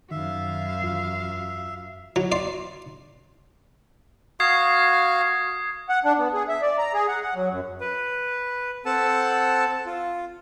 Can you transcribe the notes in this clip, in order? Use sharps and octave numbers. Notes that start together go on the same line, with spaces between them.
F#2 D#3 E5 F5
E2 F4
F#3
D5 C6
F#4 F5 D#6 G#6 C7
F#5
D4
B3
G#4
E5
D5
A#5
G#4
F#5
F#5
F#3
F#2
B4
C4 A4 F#5 A5 E6
F4